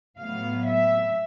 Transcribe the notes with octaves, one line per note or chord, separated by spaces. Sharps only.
A2 F#3 B3 F5
E5